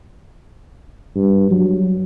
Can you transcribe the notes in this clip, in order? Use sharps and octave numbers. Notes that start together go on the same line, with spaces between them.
G2
F#3